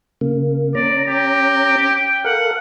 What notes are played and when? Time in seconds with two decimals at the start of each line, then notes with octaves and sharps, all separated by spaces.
0.21 C#3 A#3
0.75 C#4 D5 A#5
1.08 G4
1.96 G5
2.24 A4 A#4 F5 F#5